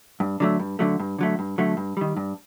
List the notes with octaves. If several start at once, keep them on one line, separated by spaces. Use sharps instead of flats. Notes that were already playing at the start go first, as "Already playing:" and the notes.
G2
D3 F#3 A3
G2
D3 F#3 A3
G2
D3 F#3 A3
G2
D3 F#3 A3
G2
D#3 G3
G2